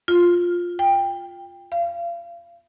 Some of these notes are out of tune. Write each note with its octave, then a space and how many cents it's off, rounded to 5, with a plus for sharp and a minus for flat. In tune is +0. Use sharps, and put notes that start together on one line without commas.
F4 +5
G5 +15
F5 -35